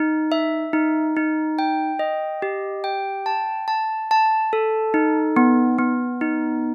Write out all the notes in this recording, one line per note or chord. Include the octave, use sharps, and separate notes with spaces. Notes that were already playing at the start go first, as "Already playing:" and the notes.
Already playing: D#4
E5
D#4
D#4
G5
D#5
G4
G5
A5
A5
A5
A4
D#4
B3
B3
D#4